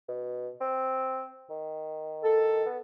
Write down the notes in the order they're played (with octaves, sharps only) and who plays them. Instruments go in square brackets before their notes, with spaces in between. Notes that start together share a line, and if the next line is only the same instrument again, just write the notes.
[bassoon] B2
C4
D#3
[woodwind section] A4
[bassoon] B3